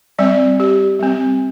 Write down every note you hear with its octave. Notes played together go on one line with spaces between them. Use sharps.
G3 C4 D5
G4
G3 C4